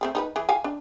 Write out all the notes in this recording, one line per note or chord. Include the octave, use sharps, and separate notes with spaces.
A3 C4 G#4
D#4 G#4 B4
E3 G#4
F5 G5 G#5
D4